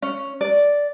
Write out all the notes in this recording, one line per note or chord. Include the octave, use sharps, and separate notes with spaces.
C#4
D5